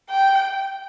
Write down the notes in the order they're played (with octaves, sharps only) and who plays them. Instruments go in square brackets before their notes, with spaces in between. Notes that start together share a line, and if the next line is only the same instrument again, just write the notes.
[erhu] G5